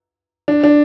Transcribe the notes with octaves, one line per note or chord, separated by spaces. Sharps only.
D4
D4